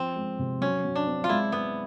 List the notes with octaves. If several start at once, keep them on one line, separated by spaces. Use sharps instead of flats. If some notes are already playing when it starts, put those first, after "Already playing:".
Already playing: F3 C4
G#3
C3
F#3 C#4
F#3
D4
C4
F4
G#3 E4
G#3 B3